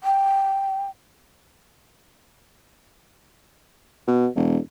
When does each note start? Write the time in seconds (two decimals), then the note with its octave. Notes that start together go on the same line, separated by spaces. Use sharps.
0.04 G5
4.08 B2
4.36 E1